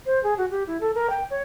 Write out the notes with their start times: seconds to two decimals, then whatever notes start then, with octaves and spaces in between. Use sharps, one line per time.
0.06 C5
0.23 G#4
0.38 F#4
0.51 G4
0.67 E4
0.81 A4
0.95 A#4
1.10 G5
1.31 C#5